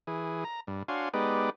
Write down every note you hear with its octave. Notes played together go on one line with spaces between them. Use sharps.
E3 G#4
A#5
G2
D4 F#4 C#5 F5 G#5 C6
G#3 B3 D#4 G4 B4 D5